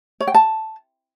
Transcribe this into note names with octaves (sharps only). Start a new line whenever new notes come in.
C#5
G5
A5